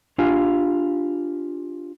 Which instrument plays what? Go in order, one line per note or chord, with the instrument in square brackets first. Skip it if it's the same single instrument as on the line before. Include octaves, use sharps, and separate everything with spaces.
[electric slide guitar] D4 F4 G4 F5 G#5